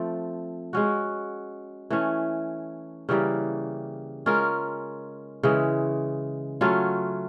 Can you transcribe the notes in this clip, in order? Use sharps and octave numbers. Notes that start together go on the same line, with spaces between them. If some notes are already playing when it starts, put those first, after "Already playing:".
Already playing: F3 A3 C4
G#3 C#4 F#4
E3 A3 C#4
C#3 E3 G3 A#3
G#3 C#4 F4 A#4
C#3 E3 G#3
F#3 A3 C#4 F4